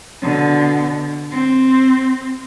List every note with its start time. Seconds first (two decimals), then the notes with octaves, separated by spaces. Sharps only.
0.22 B2 D3
1.31 C4